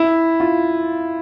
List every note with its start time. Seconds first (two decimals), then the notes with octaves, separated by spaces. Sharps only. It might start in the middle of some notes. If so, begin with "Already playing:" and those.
Already playing: E4
0.40 F4